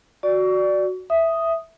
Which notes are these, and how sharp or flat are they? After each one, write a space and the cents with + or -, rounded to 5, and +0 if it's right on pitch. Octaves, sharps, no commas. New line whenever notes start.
F#4 +0 D5 +0 C#6 +35
E5 +0 D#6 +0